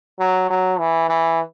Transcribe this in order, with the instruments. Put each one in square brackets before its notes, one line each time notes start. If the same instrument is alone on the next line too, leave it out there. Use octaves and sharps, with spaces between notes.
[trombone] F#3
F#3
E3
E3